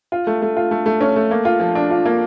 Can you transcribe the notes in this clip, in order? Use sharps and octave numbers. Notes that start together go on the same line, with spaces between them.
F4
A3
A3
F4
A3
A3
C#4
A3
A#3
F4
F3
D4
F4
A#3